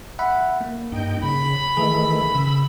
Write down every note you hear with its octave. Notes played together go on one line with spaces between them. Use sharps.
E5 F#5 B5
A#3
G2 D#4 G5
C#3 B5
D#3 E3 A3 G#4
C#3 E6